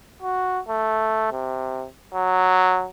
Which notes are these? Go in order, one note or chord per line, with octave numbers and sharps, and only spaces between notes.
F#4
A3
C3
F#3